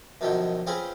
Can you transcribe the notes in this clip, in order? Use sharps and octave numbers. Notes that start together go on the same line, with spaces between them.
F#2 B2 D3 D#3 F3 F#3
C4 C#4 F4 G#4 B4 C5